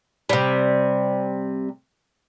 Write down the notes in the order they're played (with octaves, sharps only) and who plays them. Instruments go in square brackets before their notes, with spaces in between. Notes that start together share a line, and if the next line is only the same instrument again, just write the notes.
[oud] C3 G3